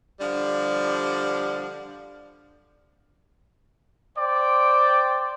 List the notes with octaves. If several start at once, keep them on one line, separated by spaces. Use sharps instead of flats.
D3 F3 G3
C5 D5 G5